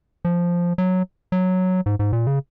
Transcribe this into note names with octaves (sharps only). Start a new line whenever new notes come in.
F3
F#3
F#3
G#2
G#2
A#2
C#3